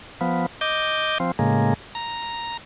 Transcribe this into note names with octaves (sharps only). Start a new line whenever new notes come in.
F3 B3
D#5 D6 G6
F3 C4
A2 C#3 G#3 A#3
A#5